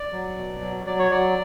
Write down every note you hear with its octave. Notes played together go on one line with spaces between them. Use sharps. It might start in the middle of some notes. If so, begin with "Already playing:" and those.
Already playing: D5
F#3
B2
F#3
F#3 D5
C#5
F#3 D5